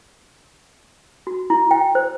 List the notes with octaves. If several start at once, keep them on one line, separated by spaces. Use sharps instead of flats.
F#4
E4
G5
C5